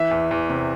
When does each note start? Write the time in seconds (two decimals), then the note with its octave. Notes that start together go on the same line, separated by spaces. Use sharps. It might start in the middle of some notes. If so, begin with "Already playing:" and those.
Already playing: E3 E5
0.11 E2
0.31 E2
0.49 C3